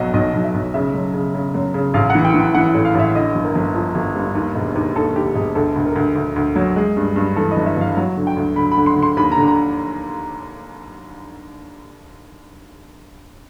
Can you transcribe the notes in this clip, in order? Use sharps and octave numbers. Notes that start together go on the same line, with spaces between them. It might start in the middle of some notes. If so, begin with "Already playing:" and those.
Already playing: B1 B2 F#3 D#5
B1 D#5
B1
E5
B1
C#3 E5
F#2
C#3
C#3
F#2
C#3
A1 F5
F#5
E3
G5
E3
G5
E3 F#5
F#5
A2
F5
A1 E5
D3 D#5
G1
A#4
G1
F3
G1
G2
D#2
E1
D#2
D#2 A4
D#2 G4
E1 G#4
D2 A4
D2
A#4
D2
D2
D2
F#3
G#3
G2
G2
E3 A4
D#5
G1
E5
G1 F5
F#3
D3
G5
D2
D3 B5
B5
D3
C6
D3
C6
D#2 B5
A#5
D3
A#5